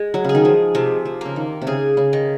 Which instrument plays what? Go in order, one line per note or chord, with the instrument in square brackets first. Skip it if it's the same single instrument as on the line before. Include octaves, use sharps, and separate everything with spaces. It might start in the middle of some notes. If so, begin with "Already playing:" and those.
Already playing: [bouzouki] G#3
[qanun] F#3
[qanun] C#3 [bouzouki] G#4
[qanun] D#3
F3
[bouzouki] C3 [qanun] F3
[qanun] F3
[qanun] C#3 [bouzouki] A#3
[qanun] D#3
C3
[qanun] C#3 [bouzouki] G#4
[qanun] C#3
[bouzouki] D#3